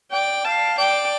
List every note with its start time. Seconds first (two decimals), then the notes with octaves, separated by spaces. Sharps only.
0.11 D5 G5
0.45 F5 A5
0.78 D5 G5